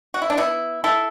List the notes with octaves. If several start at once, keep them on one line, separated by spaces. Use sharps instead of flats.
F#4
E4
D4
B3 E4
E4 A4